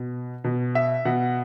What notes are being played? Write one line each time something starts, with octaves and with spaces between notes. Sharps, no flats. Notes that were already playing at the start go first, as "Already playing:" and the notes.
Already playing: B2
B2
E5
B2 F#5